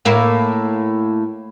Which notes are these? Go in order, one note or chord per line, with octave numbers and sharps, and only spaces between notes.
A2 A#3 E4